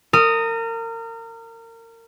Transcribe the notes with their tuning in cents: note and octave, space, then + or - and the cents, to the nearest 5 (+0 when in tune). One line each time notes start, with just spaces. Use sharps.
A#4 -30 D#6 +0